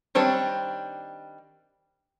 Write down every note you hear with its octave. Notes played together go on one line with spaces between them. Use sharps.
D#3 G3 C4 D4 C#5